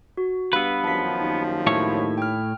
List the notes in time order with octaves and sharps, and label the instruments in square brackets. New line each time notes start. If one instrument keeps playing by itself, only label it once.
[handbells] F#4
[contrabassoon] G2 [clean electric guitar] B3 B4 [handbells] F5 E6
[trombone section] F#2 D#3 F3 [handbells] A5 B6
[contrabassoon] D#2
[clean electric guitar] A2 E4 C#5
[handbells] G5 F6